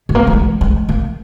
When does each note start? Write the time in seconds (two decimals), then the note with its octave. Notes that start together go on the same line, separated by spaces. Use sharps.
0.09 G#3
0.15 A#3
0.27 F#3
0.33 G#3
0.61 G#3
0.89 A#3